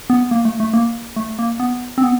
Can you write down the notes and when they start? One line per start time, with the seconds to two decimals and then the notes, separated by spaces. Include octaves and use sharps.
0.10 B3
0.31 A#3
0.45 A3
0.60 A3
0.74 A#3
1.16 A3
1.39 A#3
1.60 B3
1.98 C4
2.03 B3